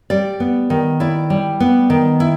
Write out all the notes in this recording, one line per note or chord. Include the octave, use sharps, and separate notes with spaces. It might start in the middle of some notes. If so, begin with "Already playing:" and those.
G3 D5
B3
D#3
E4 D5
G3
B3
D#3
E4